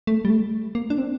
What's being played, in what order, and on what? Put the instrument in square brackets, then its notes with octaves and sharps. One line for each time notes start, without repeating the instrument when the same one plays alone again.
[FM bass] A3
G3
A3
A#3
D4
C4